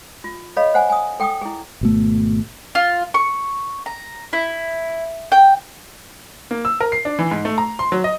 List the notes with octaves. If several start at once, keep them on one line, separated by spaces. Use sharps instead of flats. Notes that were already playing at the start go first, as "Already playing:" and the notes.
F4
A4 C#5 D#5 F5 B5
C5 F#5 G#5
G#5 D#6
A4 G5 C#6 D#6
E4 G#4
G#1 B2 A3
F4
C#6
A#5
E4
G5
A#3
E6
A#4
C7
D4
E3
G#2
A3
A#5
C6
F#3
D#5